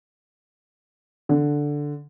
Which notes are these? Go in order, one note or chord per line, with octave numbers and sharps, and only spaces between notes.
D3